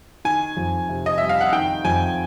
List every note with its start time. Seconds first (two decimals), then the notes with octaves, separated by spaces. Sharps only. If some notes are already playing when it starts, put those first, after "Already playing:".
0.25 D#3 G#5
0.57 F2
0.89 C3
1.06 D#5
1.18 G3 E5
1.29 F5
1.41 F#5
1.52 D#3 G5
1.85 F2 G#5